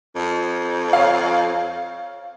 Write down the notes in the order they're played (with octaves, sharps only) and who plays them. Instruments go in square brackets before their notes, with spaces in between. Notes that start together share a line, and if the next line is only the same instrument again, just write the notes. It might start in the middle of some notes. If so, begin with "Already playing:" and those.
[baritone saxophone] F2
[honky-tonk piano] C#5 F5